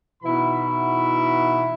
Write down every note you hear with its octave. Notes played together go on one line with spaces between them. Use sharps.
B2 E3 D#4 E4 F#4 B5